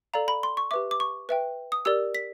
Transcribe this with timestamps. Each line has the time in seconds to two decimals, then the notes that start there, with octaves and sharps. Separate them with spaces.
0.13 A4 D5 F5 A#5
0.28 B5
0.43 C6
0.57 C#6
0.71 G4 B4 E5 D6
0.91 D6
1.00 C#6
1.29 B4 E5 G5
1.72 D#6
1.85 G4 A#4 D5 E6
2.15 B6